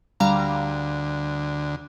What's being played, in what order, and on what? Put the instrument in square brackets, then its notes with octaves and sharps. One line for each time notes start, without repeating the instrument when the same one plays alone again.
[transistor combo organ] D2 [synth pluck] G3 F5 A#5